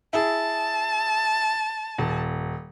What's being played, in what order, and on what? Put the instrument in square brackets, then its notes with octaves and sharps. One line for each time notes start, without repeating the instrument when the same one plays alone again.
[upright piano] E4 G#4 [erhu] A5
[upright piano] D#1